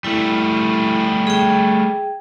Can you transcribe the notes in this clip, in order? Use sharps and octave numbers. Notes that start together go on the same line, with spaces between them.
G3 A3 E4
G#4 G5